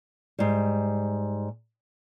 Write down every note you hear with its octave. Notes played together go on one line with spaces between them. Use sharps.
G#2 G3